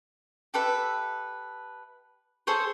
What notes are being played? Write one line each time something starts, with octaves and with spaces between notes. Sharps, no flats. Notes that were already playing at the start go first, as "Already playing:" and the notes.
G4 A4 B4 E5
G#4 A4 C5 C#5